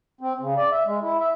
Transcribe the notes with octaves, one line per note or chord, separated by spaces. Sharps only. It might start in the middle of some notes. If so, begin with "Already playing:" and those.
C4
C#3
D5
E5
G#3
E4
E5